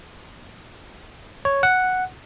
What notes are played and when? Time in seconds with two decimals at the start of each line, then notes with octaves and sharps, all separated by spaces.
1.45 C#5
1.63 F#5